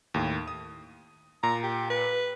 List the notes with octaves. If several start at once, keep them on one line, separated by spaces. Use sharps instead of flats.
D#2 A2
D#6
A#2 A#5
G4
B4